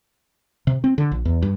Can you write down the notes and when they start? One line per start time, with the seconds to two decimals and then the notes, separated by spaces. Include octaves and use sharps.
0.67 C3
0.84 C4
0.98 D3
1.12 A#1
1.25 E2
1.42 G2